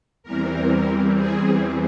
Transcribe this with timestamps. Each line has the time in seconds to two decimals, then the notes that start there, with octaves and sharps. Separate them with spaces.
0.23 E2 E3 G3 C4 A#4
1.15 G#4